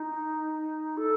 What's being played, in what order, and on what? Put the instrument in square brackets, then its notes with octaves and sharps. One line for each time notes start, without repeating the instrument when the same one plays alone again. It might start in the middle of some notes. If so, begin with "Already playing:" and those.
Already playing: [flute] D#4
A4